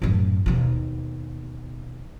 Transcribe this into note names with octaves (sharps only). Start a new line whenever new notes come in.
F#2 A2
D#2 B2